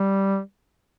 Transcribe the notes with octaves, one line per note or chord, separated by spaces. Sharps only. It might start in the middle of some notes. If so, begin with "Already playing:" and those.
Already playing: G3